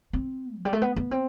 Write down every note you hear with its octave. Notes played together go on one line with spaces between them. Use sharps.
C4
F3
G3
A3
B3
B3
C4